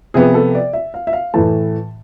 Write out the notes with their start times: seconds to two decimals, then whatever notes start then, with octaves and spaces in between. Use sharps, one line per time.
0.14 C3 F3 B3 G#4
0.34 A4
0.55 D5
0.73 E5
0.94 F5
1.07 E5
1.13 F5
1.34 A2 E3 A3 A5